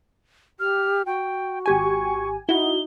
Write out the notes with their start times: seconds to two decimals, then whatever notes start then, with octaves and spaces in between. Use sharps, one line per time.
0.60 G4 F6
1.06 F#4 G5
1.66 G#1 G4 G#5 C#6
2.49 D#4 E4 F#4 G7